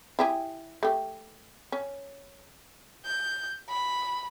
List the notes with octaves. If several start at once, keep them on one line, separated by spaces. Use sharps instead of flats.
E4 G4 G#4
A3 G4
C#4
G6
B5